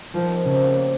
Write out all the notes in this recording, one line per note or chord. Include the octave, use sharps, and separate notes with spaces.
D#3 F3
C3
C#3 F3
D#3
C#3
C3
A#2